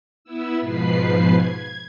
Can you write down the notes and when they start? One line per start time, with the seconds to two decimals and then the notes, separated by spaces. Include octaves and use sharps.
0.24 B3 E4 E6
0.61 G#2 B2 F3 B4 B5 C7
1.32 G#6